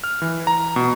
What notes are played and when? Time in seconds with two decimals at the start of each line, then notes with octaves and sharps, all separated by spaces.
0.04 F6
0.22 E3
0.47 A#5
0.76 B2